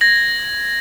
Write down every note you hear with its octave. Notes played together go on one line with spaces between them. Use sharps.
G#6 A#6 F#7